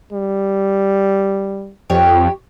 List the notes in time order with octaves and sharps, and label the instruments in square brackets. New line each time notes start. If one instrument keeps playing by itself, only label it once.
[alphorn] G3
[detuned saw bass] F2 [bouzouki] G4 C#5